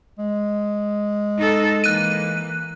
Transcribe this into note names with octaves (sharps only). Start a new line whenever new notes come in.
G#3
D#4 A4
E3 A#3 F#6 D#7